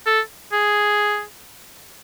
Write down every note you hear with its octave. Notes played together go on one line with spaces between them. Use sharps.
A4
G#4